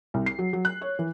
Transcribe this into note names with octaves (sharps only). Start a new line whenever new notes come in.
C2
C7
F#3
F#3
F#6
C#5
E3